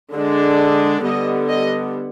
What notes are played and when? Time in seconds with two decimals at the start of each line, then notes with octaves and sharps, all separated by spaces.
0.15 D3 G#3 D4
1.04 D3 G3 B3 D#5
1.49 D#5